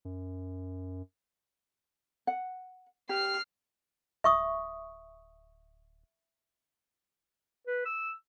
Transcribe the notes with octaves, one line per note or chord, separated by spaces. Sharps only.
F#2
F#5
G4 F6 C7
D1 E5 C#6 D#6
B4
E6